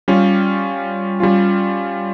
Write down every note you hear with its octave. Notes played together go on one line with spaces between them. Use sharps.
G3 C#4 F4
G3 C#4 F4